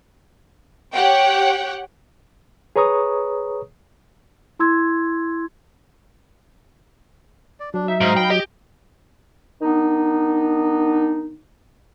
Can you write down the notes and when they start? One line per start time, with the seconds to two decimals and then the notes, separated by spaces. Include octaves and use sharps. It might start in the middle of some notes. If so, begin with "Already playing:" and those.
0.93 G4 C#5 F#5 G5
2.76 G#4 B4 C#5 A#5 C#6 D#6
4.59 E4 C6 E6 G#6
7.60 D5
7.74 F#3 D4
7.88 D#4 E5
8.01 G#2 D#4 F5 A#5
8.17 G5 B5
8.30 G4 D#5
9.61 D#3 B3 D4 D#4